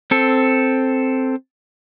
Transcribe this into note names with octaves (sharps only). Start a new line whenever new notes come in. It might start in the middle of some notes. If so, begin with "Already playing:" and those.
C4 A4